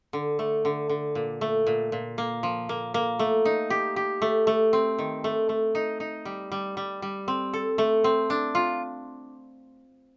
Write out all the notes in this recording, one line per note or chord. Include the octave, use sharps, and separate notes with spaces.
D3
A3
D3
D3
A#2
A3
A#2
A#2
A#3
F3
A#3
A#3
A3
D#4
G4
G4
A3
A3
C4
D#3
A3
A3
D#4
D#4
G3
G3
G3
G3
C4
A4
A3
C4
D4
F4